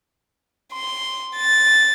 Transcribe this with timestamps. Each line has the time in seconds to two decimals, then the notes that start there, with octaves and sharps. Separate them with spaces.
0.74 C6
1.36 A6